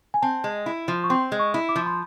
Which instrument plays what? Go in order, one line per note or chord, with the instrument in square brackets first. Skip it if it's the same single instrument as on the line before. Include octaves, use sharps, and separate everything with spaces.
[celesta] G#5
[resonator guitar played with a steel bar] C4 [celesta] A5
[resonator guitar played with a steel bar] G#3
E4
F3
[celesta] C#6
[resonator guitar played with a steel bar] C4 [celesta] C6
[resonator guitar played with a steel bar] G#3
[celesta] C#6
[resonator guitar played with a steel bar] E4
[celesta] D6
[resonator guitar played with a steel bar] F3
[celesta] C6